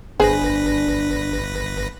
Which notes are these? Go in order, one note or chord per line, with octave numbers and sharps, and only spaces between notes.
G1 D4 G#4 B4 C5 A#6